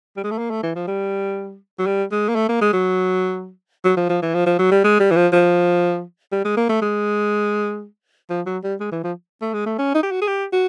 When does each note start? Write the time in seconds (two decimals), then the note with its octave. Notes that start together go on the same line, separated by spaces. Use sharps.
0.17 G3
0.24 G#3
0.31 A3
0.38 A#3
0.50 A3
0.63 E3
0.75 F3
0.88 G3
1.79 F#3
1.86 G3
2.12 G#3
2.28 A#3
2.35 A3
2.48 A#3
2.61 G#3
2.73 F#3
3.84 F#3
3.97 F3
4.09 F3
4.22 E3
4.34 F3
4.46 F3
4.59 F#3
4.71 G3
4.84 G#3
5.00 G3
5.11 E3
5.16 F3
5.32 F3
6.32 G3
6.44 G#3
6.57 A#3
6.69 A3
6.82 G#3
8.30 F3
8.46 F#3
8.63 G3
8.80 G#3
8.92 E3
9.04 F3
9.41 A3
9.53 G#3
9.66 A3
9.78 C#4
9.95 D#4
10.03 G4
10.11 F#4
10.21 G#4
10.28 G4
10.52 F#4